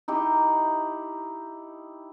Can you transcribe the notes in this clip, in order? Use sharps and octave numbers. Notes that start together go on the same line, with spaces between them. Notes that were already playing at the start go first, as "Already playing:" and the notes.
D#4 E4 G4